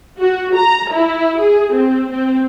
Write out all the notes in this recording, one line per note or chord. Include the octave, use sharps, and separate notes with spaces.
F#4
A#5
E4
G#4
C4
C4